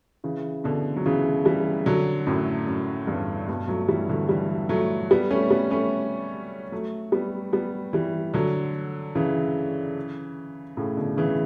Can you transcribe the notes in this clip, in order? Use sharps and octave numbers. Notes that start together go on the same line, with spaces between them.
C#3 E3
B2 D3
F#3
C#3 E3
E3 G3
D3 F#3
F#2 A2
F#2
E2 G2
G2 B2
F#3 A3
E3 G3
D3 F#3
E3 G3
F#3 A3
G3 B3
A3 C#4
G3 B3
A3 C#4
F#3 A3
G3 B3
G3 B3
E3 G3
D3 F#3
C#3 E3
A2 C#3
B2 D3
C#3 E3